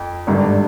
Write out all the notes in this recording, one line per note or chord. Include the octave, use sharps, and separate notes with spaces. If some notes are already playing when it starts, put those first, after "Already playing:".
Already playing: F2
G#1 G2 D3